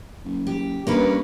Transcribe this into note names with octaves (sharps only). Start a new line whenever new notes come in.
F#1
G4
G2 A#3 C#4 B4